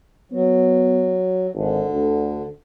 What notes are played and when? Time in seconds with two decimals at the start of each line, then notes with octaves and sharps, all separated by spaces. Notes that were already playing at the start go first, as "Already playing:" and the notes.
0.32 F#3 B3
1.54 G#1 D3
1.92 D2